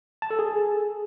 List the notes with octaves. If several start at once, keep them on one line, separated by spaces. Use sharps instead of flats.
A5
A4
G#4